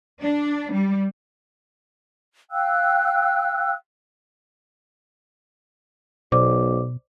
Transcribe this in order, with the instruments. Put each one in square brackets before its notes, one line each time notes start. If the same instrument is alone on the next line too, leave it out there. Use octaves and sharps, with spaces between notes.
[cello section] D4
G3
[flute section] F5 G5 E6 F#6
[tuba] B1 [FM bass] B2 [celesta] C5 D5 D6